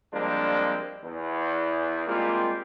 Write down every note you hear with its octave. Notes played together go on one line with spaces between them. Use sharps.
F3 G3 G#3 A#3 C4 D4
E2
G3 G#3 A#3 C4 F4